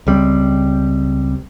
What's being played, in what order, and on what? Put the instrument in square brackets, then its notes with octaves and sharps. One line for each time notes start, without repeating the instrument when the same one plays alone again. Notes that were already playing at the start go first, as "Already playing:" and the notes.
[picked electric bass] C#2 G3 C4